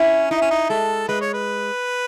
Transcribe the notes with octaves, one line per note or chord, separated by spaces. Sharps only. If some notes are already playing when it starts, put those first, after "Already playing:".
Already playing: C#4 E4
D#4 E4
C#4
D#4
G#3 A4
G#3 B4
C#5
B4